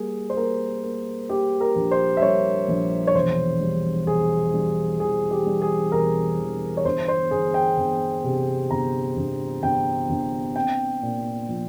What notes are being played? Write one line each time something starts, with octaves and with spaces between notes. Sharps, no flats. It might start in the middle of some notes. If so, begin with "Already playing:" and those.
Already playing: G3 A#3 G#4
C5
A#3 A#4
A#3
A#3 G4
A#4
A#1
C5
E5
G3 C#5
A#1
C#5
E1 C5
G3
E1 G#4
G3
E3 G#4
G4
G3
G#4
E1 A#4
E3
C#5
G1 C5
C5
G1 G#4
G5
G1
C3
G1 A#5
G1
G1 G5
G1
C4 G5
A#2
F3